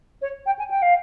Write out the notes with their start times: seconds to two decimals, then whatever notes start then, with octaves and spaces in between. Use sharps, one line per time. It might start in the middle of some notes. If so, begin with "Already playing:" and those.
0.21 C#5
0.46 G5
0.58 G#5
0.70 G5
0.82 F5